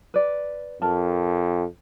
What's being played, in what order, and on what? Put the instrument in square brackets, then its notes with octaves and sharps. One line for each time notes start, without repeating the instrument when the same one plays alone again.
[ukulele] B4 D5
[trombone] F2 [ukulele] A#4 A5